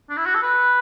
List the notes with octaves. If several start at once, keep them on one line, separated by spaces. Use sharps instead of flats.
D4
E4
F#4
A4
B4